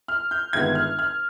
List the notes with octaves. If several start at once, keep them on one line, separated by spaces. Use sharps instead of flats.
F6
G6
G1 G2 D#3 G#3 B3 G#6
F6
F6